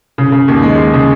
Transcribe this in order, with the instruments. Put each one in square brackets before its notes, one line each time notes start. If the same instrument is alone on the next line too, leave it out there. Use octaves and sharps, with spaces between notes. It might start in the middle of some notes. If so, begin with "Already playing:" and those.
[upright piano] C#3
C#3
D#2
G#3
G#3
C#3